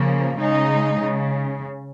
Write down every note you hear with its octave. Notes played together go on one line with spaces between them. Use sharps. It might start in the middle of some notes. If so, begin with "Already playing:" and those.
Already playing: C#3 F3 A#3
C#3 G#3 D#4
C#3